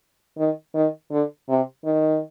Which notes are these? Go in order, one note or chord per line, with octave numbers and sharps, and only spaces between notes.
D#3
D#3
D3
C3
D#3